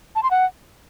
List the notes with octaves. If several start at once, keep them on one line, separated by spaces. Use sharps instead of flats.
A5
C6
F#5